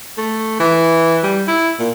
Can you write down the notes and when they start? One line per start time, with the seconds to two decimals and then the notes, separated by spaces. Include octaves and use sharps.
0.18 A3
0.60 E3
1.23 G3
1.47 E4
1.79 A#2